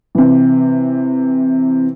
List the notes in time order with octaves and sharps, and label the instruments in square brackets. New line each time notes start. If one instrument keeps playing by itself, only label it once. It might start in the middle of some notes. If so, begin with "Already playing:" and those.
[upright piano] C3 E3